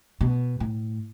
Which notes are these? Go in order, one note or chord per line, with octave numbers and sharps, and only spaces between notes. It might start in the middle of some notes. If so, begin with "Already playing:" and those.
B2
A2